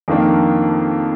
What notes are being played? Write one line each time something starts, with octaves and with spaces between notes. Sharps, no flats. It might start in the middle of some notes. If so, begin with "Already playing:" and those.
F2 D#3 A#3 D4